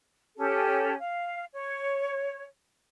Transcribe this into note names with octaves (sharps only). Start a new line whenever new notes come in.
C#4 G4 A4
F5
C#5